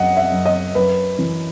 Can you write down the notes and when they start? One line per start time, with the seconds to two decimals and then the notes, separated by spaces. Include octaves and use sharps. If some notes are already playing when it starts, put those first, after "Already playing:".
Already playing: F#2 F#3 D#5 F#5
0.17 E5
0.32 F#2
0.46 D#5
0.75 F#2 B4
1.19 E3